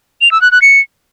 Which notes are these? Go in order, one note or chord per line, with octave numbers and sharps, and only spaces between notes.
F7
E6
F#6
F#6
C#7